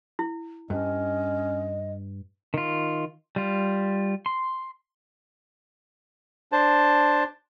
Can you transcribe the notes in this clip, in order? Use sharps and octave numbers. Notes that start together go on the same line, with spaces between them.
E4
G2 C#4 D#5
D#3 F4
G3 F4
C6
D4 C5 A5